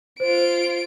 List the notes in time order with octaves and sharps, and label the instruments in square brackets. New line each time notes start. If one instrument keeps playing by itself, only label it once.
[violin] F4 D7 [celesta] C5